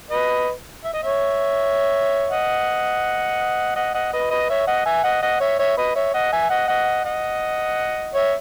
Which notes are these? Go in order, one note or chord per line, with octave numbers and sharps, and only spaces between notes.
B4 D#5
E5
D#5
C#5 E5
D#5 F#5
D#5 F#5
D#5 F#5
B4 D#5
B4 D#5
C#5 E5
D#5 F#5
E5 G#5
D#5 F#5
D#5 F#5
C#5 E5
C#5 E5
B4 D#5
C#5 E5
D#5 F#5
E5 G#5
D#5 F#5
D#5 F#5
D#5 F#5
C#5 E5